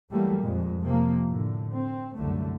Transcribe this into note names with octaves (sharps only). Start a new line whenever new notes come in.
E3 F#3 G3 A3 A#3
F2 A#2 G#3
C3 F3 A#3
A2 D3
C4
C2 F#2 D3 A3